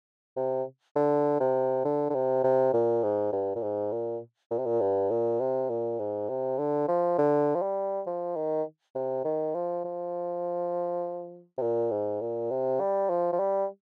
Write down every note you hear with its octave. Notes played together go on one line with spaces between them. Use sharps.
C3
D3
C3
D3
D3
C3
C3
A#2
G#2
G2
A#2
G#2
A#2
A#2
C3
A#2
G2
A#2
C3
A#2
G#2
C3
D3
F3
D3
F3
G3
F3
D#3
C3
D#3
F3
F3
C3
A#2
G#2
A#2
C3
G3
F3
F3
G3